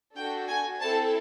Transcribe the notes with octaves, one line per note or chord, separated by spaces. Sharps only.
D4 F#4 A4 G5
G#5
C4 E4 A4 A5